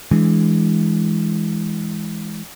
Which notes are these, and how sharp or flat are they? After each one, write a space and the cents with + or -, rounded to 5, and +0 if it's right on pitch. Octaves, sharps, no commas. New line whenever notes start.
E3 +0 G#3 +0 D4 +0